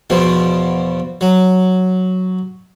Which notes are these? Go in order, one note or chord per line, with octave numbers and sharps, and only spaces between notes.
E2 B2 F3
F#3